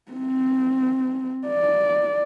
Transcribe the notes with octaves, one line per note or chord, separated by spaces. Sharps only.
C4
D5